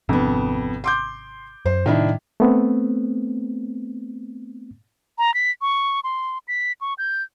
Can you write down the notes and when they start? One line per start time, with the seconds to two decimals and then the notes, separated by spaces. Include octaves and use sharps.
0.09 G#1 F2 C3 B3 D4
0.84 C6 D6 G6
1.66 F#2 C5
1.86 A2 C3 D#3 G3 D4 E4
2.40 A3 B3 C4
5.18 A#5
5.34 B6
5.62 C#6
6.04 C6
6.48 B6
6.81 C#6
6.98 G6